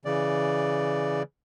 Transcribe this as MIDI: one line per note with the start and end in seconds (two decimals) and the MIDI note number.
0.05 1.23 49
0.05 1.23 52
0.05 1.23 74